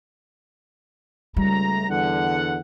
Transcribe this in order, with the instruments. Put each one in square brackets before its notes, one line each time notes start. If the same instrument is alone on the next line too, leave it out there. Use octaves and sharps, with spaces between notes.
[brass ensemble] C#2 A3 A#5 [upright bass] G3
[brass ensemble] E2 D3 F#5